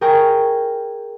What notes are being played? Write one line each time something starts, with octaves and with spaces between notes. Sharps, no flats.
G#4 A#4 G5 A#5 C#6